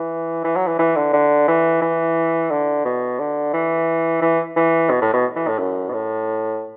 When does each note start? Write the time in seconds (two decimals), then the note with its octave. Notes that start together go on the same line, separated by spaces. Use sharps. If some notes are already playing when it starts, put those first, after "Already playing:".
Already playing: E3
0.44 E3
0.56 F#3
0.67 E3
0.79 E3
0.96 D3
1.13 D3
1.48 E3
1.82 E3
2.50 D3
2.85 B2
3.19 D3
3.53 E3
4.22 E3
4.56 E3
4.90 B2
5.02 A2
5.13 B2
5.36 E3
5.48 A2
5.59 F#2
5.89 B2
5.93 A2